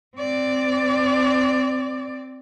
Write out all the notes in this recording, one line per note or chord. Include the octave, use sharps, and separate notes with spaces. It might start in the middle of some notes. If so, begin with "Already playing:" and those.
C4 D5